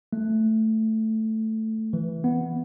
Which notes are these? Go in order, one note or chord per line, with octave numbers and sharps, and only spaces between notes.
A3
E3
B3